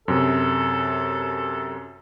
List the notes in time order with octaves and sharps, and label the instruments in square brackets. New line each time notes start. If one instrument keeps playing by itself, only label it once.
[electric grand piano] F#2 C3 [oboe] A4